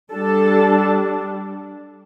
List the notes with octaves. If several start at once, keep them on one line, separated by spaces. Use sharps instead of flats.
G3 D4 A4 A5